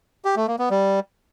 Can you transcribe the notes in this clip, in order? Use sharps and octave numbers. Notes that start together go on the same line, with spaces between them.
G4
A3
A#3
B3
G3